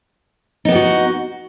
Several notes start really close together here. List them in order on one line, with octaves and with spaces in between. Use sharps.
D#4 B3 G4 F#4